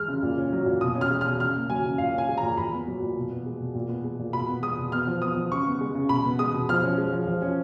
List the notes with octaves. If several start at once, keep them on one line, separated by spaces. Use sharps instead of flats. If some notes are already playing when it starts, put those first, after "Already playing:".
Already playing: G#3 F6
C#3
A#2
C#4
F#3
A#2
B2 D#6
C#4
F6
G#3
B2 F6
C#3 F6
A#3
F#3 G#5
C#3
A#2 F5
C#4 G#5
G#3
A#5
A#2
A#2 B5
B3
F#3
A#2
B2
B3
G#3
B2
A#2
B3
G#3
A#2
B2 B5
B3
G#3 D#6
B2
B3 F6
F3
B3 D#6
F3
C#3 C#6
B3
G#3
C#3
B2 B5
B3
G#3 D#6
B2
F3 F6
C#4
G#3
F3
F3
C#4